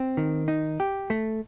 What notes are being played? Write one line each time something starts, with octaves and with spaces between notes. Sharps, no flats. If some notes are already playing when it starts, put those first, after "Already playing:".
Already playing: C4
D#3
D#4
G4
A3